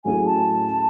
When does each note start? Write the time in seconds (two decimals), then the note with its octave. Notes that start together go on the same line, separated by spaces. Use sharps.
0.04 A2 F#3 A3 C#4 G#4 G#5
0.25 A5